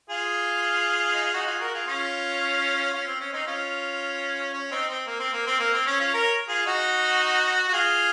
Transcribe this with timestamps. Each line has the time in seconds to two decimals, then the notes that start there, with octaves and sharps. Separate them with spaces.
0.10 F4 G#4
1.13 D#4
1.24 F4
1.34 D#4 F#4
1.47 F4 G#4
1.60 F#4 A#4
1.74 F4 G#4
1.87 C#4 F4
2.94 C#4 F4
3.07 C4
3.20 C#4
3.34 C4 D#4
3.47 C#4 F4
4.53 C#4
4.71 C4 D#4
4.89 C4
5.07 A#3
5.20 C4
5.33 A#3
5.47 C4
5.60 A#3
5.74 C4
5.86 C#4
6.00 C#4 F4
6.13 A#4 C#5
6.48 F4 G#4
6.66 D#4 F#4
7.68 F#4
7.73 F4 G#4